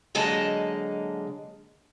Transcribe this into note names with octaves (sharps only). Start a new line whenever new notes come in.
D3 F#3 G#3 A#3 D#5 A5